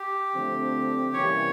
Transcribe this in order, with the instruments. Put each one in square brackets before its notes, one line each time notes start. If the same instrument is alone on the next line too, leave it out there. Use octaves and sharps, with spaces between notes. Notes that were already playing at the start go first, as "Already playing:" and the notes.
Already playing: [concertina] G4
[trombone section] D3 F3 A3 C4
[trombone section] C3 E3 G3 A#3 C#4 [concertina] C#5